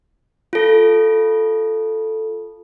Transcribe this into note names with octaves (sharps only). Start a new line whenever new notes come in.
F4 A4